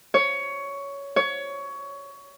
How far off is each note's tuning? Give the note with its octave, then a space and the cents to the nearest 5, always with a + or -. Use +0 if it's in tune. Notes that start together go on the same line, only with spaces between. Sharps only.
C#5 +15
C#5 +20